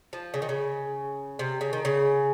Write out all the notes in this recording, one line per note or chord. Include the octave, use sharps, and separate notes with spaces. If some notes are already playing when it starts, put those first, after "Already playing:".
F3
C#3
D#3
C#3
C3
C#3
D#3
C#3